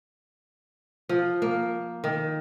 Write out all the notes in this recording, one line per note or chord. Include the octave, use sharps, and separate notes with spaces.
F3
A#3
D#3